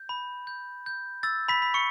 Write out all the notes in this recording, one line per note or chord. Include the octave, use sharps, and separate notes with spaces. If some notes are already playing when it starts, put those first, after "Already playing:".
Already playing: G6
B5
G6
G6
E6 A6
B5 B6
B5
C#6 C#7